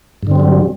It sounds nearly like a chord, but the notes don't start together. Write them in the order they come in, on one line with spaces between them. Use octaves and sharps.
G2 D3 C4 G3 F#3